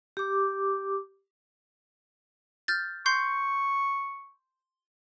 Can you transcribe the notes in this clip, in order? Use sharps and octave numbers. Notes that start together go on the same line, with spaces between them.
G4 D6
F6 G6 A6
C6 C#6 G6 C7